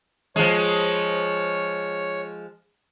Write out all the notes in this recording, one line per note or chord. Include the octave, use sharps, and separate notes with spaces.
F3 G#3 C#5